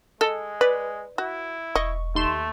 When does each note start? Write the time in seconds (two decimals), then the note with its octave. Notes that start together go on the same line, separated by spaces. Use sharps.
0.21 G#3 A4 D#5
0.61 B4 D5
1.18 E4 F#4
1.75 E1 D#5 C#6
2.15 D#2 A3 C6 E7